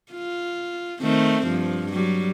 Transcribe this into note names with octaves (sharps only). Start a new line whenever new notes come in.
F4
D#3 A3 C4
G2 F3
F#3 G3